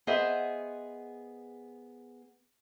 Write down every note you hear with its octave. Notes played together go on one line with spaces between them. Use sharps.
B3 G#4 C5 D#5 E5